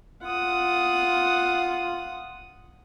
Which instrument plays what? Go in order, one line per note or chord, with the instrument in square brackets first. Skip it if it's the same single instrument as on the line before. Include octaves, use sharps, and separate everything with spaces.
[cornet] F4 [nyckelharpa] F#5 D#6